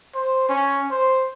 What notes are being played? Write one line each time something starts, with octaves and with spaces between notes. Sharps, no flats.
C5
C#4
C5